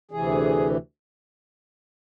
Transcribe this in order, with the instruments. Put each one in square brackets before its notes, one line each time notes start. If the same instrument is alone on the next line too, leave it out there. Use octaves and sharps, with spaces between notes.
[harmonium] D2 C3 E3 G#4